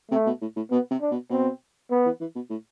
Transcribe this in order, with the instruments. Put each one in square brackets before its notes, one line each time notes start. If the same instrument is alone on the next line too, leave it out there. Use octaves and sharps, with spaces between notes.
[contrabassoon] C3 [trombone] A3
[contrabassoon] B2
A2
A2
[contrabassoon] B2 [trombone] B3
[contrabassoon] C3
[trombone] D4
[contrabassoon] B2
[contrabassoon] B2 [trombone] C4
[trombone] B3
[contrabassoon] E3
E3
B2
A2